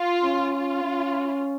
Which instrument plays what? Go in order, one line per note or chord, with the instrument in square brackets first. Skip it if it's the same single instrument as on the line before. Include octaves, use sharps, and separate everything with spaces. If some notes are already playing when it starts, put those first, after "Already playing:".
Already playing: [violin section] F4
[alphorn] C#4
[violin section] F4
[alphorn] C#4